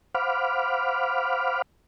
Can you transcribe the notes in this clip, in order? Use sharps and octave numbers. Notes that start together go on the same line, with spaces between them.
C5 F5 F#5 B5 D6 F6